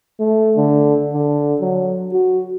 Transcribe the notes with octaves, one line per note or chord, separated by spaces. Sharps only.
A3
D3
D3
F#3
F#4